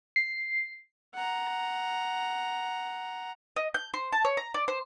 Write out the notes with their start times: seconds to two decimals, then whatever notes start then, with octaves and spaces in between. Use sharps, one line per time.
0.16 C7
1.15 F#5 A#5
3.56 D#5
3.74 G6
3.94 C5
4.12 A5
4.25 C#5
4.37 A#5
4.54 D5
4.68 C5